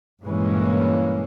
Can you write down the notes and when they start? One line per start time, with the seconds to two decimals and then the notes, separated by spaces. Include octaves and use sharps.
0.23 G2 A#2 E3 G#3 A#3 C#4